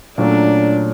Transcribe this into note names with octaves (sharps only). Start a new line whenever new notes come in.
A#2 F#3 A3 C#4 D4